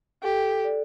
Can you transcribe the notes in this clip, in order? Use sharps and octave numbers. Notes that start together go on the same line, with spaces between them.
G4 A4
D5